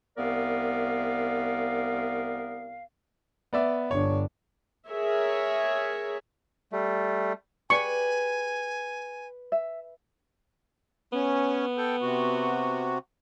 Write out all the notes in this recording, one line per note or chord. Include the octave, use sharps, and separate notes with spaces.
C2 B3 A#4 D5 F5
B3 D5 E5
G1 D4 C#5
G#4 A#4 C#5 E5
G3 A3
G4 G#4 B4 D5 G#5 C#6
E5
B3 C#4
A4 G5
C3 F#4